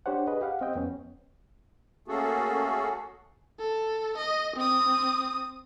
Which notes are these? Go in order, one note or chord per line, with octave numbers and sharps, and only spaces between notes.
D4 G4 C5 C#5 F#5
G#4 B4 D#5
G4 F5 F#5
C4 D#5 G5
F2 B3 C#4
A3 A#3 C#4 F#4 G#4 A4
A4
D#5
C4 D#6